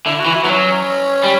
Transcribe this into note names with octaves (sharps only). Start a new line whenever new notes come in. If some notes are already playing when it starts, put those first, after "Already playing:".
D3 E4
F#4
E3
E4
F#3 B3
C#4
G3